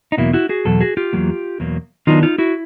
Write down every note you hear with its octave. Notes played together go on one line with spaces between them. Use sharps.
D#4
E2 B2 F#3 A#3 E4
E4 F#4
F#4 G#4
E2 B2 F#3 A4
F#4 G#4
F4 G4
E2 B2 F#3 A#3
E2 B2 F#3 A#3
D#3 F#3 B3 D4 D#4 F4
D#4 F4
E4 F#4